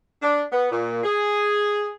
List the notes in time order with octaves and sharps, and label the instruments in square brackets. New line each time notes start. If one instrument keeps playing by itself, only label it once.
[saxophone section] D4
B3
A#2
G#4